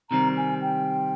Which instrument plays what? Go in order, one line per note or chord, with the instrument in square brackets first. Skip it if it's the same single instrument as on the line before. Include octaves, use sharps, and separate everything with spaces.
[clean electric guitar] C3 D#3 G3 C4 [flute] A#5
[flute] G#5
G5